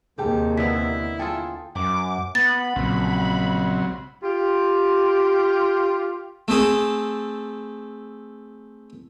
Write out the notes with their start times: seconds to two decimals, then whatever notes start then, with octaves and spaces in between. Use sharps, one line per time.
0.18 D#2 C3 G4 G#4 G5 A5
0.58 D3 B3 E4 B6
1.20 F4 G#4 A4 G5
1.76 F#2 D6
2.35 B3 B5 A6
2.76 A#1 C#3 F#3 C4
4.23 F4 G4
6.48 A3 C4 G#4 A4